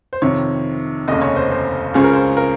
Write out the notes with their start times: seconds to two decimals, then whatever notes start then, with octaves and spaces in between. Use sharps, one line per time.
0.13 C5
0.22 F2 C3 D#3 C#5
1.08 F1 D#2 C#3 D#5
1.22 C#5
1.36 C5
1.51 C5
1.94 C#2 C#3 G#3 C#4 F4 C5
2.04 A#4
2.13 C5
2.37 A#4